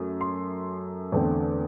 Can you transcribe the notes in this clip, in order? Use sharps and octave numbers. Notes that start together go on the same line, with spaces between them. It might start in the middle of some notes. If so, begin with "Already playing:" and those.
Already playing: F#2 A3
C6
E2 D3 A3 C4